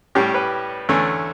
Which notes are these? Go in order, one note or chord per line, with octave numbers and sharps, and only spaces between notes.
A2 G3 C#4 G4
B4
E2 D3 A3 C#4